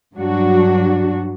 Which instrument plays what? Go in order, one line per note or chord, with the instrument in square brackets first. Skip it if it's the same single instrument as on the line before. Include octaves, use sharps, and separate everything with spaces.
[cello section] G2 F#3 D4 F#4